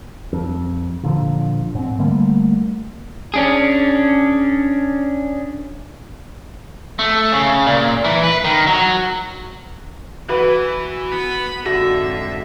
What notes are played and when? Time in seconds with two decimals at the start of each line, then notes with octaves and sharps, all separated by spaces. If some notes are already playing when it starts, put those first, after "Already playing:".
0.33 F2
1.03 A#2 D3 F3
1.75 G#2 C4
1.99 D3 G3 A3 A#3
3.34 C#4 D4 G#4
6.99 A3
7.32 C#3
7.66 A#2
8.05 E3
8.23 B4
8.44 D#3
8.67 F#3
10.29 E3 F#4 B4
11.12 B3 B5
11.66 F2 G#2 D3 F#4 E5 A#6